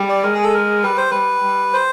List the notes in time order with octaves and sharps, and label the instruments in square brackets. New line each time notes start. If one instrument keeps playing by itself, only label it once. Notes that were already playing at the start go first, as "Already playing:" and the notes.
Already playing: [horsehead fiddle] G3
[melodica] D5
[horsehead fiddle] G#3 [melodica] A#4
[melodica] G#4
A4
A#4
[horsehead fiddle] G3 [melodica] B4
[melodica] C5
[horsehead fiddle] G3 [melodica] B4
[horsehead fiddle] G3
[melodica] C5